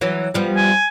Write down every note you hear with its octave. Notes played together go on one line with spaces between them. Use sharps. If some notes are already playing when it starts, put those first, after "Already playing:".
E3 F#3
F3 G3 B3
G#5